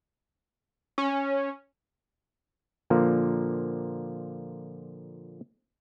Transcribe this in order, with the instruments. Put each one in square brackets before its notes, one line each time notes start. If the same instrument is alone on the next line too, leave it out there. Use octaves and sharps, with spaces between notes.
[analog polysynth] C#4
[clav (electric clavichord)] A#2 D3 F3 A#3